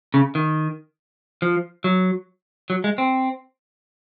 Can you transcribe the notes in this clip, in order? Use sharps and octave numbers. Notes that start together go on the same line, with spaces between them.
C#3
D#3
F3
F#3
F#3
G#3
C4